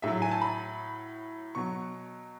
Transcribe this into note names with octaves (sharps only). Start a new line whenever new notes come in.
A2 F#3 E5
G#5
A5
B5
B2 F#3 C#6